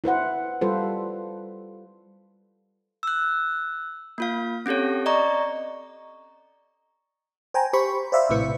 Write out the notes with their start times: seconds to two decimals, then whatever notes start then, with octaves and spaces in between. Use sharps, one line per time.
0.04 E4 B4 C5 F#5
0.61 G3 F4 A4 B4 C5
3.03 E6 F#6
4.18 A#3 F4 F5
4.66 C4 C#4 G4 A4 C#5
5.06 D5 D#5 A#5 C#6
7.54 C5 G5 G#5 A#5
7.73 G4 C5 B5 C#6
8.12 C5 D5 E5 F5 B5
8.30 A#1 A2 C3 E4 B4 C#7